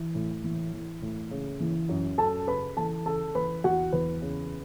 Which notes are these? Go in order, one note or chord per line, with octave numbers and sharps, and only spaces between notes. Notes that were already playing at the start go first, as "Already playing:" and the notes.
Already playing: E3
A2
E3
E3
A2
C#3
E3
F#2
F#2 A4 A5
C#3 B4 B5
E3 A4 A5
C#3 A4 A5
E3 B4 B5
E2 F#4 F#5
E2 B4
C#3